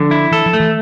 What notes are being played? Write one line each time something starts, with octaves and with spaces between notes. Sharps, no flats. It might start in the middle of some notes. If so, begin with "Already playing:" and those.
Already playing: D3 F3
E4
E3 A4
F3
A3
E3